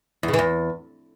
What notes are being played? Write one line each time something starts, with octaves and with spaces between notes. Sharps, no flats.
E2
C#3
E3
E2